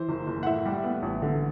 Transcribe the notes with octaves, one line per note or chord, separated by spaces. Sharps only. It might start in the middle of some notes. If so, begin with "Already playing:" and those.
Already playing: E3 C5
F#1
F#1
F#5
A2 E5
G3
B3
A1
D3